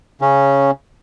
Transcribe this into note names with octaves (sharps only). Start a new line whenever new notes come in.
C#3 C#4